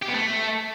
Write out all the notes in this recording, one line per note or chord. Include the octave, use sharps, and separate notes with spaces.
G4
B3
A3